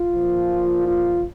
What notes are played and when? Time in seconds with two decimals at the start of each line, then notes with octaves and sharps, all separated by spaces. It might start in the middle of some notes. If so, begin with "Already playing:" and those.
Already playing: F4
0.14 A#2 F3
0.85 F4